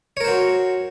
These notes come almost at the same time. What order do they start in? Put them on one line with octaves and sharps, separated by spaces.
C#5 A#4 C5 F#4